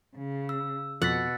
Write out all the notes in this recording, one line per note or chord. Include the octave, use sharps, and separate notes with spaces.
C#3
E6
F2 B2 F#5 E6 A6 B6